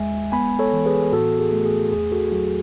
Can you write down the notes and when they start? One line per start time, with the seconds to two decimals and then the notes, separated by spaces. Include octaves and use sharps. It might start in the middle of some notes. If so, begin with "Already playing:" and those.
Already playing: D#2 G#3 E5 G#5
0.32 B3 G#5 B5
0.59 A4 C#5
0.73 E3
0.86 G#4 B4
1.12 A2 F#4 A4
1.39 G#4
1.53 A3
1.66 G#4
1.92 E2 G#4
2.12 F#4 A4
2.32 F#3 F#4